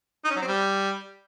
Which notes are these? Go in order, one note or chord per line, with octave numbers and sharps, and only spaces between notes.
D#4
C#4
F#3
C4
G3